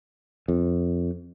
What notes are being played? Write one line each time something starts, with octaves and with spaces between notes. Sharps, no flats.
F2